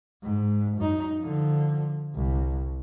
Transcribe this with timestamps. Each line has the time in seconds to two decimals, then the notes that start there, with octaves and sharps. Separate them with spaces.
0.23 G#2
0.77 F#2 D#4
1.20 D3 F3
2.15 C2